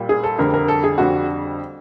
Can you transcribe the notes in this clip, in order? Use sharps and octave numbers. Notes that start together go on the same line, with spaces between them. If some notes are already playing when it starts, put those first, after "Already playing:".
Already playing: A#2 G3
G#4
A4
F2 D3 G3 A#4
A#4
A4
G#4
F2 D3 G3 F#4